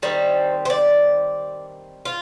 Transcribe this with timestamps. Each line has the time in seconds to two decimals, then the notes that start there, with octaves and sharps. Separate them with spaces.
0.02 D#3 G3 C4 C5
0.65 C5
0.70 D5
2.05 F4